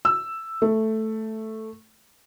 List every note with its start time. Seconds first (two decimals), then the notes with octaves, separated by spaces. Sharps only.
0.05 E6
0.62 A3